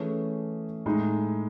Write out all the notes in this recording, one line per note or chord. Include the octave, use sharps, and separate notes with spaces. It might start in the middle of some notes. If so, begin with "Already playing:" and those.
Already playing: E3 A3 C#4 G#4
A2 G#3 D#4